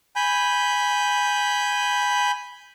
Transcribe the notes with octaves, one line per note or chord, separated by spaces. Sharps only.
G#5 B5 G6